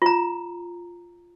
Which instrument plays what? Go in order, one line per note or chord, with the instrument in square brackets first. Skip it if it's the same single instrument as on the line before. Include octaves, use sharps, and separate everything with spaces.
[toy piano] F4 A#5